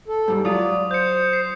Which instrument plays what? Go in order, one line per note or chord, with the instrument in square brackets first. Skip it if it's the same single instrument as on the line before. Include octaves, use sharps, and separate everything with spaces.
[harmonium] A4
[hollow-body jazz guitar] G#2 G3
[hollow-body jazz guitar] F#3 F4 [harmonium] D5 [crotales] D#6
[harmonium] C5 [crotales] G6 C#7
[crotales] C7